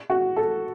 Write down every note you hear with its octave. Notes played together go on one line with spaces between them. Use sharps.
F#4
A4